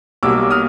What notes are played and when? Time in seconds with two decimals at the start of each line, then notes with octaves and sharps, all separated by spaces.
0.23 B1 B2 G3 A#3 D6 E6
0.51 D#6 F6